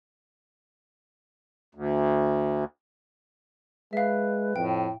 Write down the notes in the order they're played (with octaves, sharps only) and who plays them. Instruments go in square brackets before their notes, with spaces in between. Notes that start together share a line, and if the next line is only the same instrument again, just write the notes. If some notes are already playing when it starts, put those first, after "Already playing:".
[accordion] D2
[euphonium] G#3 [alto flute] B4 [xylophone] E5 F5
[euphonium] F2 [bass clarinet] A2 [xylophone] G5